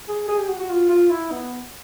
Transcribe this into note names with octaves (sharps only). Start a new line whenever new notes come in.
G#4
G#4
G4
F#4
F#4
F4
F4
E4
B3